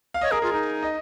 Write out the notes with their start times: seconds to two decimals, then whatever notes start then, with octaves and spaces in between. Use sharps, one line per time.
0.14 F5
0.21 C#5 D#5
0.32 G#4 A#4
0.42 F4 G#4
0.52 D#4 A#4
0.83 D#5